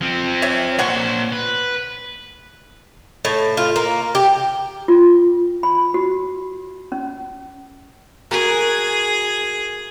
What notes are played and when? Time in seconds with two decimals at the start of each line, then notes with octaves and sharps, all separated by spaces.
0.01 F3 C4
0.42 C#5 E5
0.79 A#2 C5 C#5 F#5 C#6
1.32 B4
3.25 A2
3.57 F4
3.76 A#3
4.15 G4
4.88 F4
5.63 B5
5.94 F#4
6.92 C#4
8.31 F#4 G#4 A#4